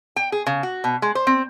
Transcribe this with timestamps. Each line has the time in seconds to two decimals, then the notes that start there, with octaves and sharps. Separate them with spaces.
0.16 G5
0.32 G#4
0.46 C#3
0.63 F#4
0.84 B2
1.02 G#3
1.15 C5
1.27 C4